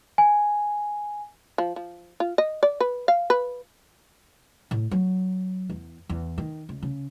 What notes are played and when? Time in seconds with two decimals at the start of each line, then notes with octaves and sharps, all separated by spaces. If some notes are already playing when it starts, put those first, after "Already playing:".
0.18 G#5
1.58 F3
1.76 F3
2.20 F4
2.38 D#5
2.63 D5
2.80 B4
3.08 F5
3.30 B4
4.71 A2
4.91 F#3
5.70 E2
6.09 E2
6.38 D#3
6.69 C#2
6.83 C#3